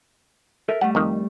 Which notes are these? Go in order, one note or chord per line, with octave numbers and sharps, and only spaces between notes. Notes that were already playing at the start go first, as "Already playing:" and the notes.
A4 A#4 E5
G3 A3 F#5
F2 D#3